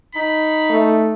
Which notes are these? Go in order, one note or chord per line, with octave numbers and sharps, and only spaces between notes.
D#4 B5
A3